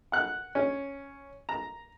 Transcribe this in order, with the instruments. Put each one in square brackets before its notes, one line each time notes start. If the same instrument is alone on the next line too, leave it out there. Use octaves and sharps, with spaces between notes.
[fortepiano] F#5 F#6
C#4
A#5